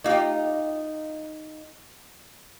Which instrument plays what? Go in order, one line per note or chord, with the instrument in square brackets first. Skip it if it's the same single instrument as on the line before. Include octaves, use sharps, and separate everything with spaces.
[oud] D#4 F4 G4